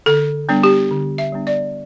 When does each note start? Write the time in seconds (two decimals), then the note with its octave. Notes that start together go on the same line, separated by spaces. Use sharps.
0.06 D3 A4
0.49 G3 B3 D4
0.63 G4
0.91 D3
1.18 E5
1.32 G3 B3 D4
1.47 D5